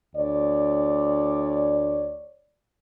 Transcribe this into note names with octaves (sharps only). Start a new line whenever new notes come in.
D2 C#5 D5